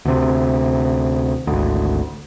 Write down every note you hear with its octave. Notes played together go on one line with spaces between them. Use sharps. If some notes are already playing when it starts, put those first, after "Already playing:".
D2 C3
G#1 D2